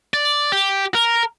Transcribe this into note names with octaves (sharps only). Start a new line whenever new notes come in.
D5
G4
A#4